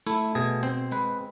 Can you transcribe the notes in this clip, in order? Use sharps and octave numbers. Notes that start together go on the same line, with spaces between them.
A3 E4
B2 G#4
C4 C5
G#3 B4